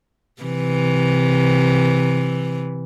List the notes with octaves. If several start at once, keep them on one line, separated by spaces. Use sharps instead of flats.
C3 E3